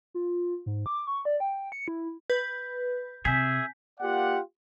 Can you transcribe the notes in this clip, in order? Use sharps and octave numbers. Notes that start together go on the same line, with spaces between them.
F4
G#2
D6
C#6
D5
G5
C#7
E4
B4 G6
C3 G#4 E5 G#5 G6 B6
A#3 F4 G4 D5 F#5